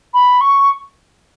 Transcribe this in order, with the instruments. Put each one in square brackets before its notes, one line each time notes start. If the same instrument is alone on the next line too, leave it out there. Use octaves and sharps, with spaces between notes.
[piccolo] B5
C#6